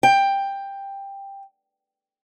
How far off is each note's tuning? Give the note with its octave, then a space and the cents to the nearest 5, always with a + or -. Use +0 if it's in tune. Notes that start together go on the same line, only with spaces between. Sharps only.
G5 +10